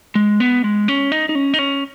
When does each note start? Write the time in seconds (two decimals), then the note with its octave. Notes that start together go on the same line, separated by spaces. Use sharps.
0.15 G#3
0.40 B3
0.64 G#3
0.88 C#4
1.12 D#4
1.29 D#4
1.35 C#4
1.54 D#4
1.59 C#4